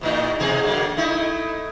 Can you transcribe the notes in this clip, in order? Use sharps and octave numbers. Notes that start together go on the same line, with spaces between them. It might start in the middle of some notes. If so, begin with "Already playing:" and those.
E2 A2 D#4
E2 B2 G#4
D3 F#3 A#3
A3 D#4 E4